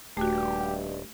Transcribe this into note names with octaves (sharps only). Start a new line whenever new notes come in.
D#1 G2 A3 F#4 G4